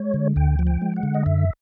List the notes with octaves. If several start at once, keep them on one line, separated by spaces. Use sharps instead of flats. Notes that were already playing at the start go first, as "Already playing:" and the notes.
Already playing: G#3 C#5
D3
D2 G5
F3
G5
G#3
F#5
D3
D#5
F#2 E5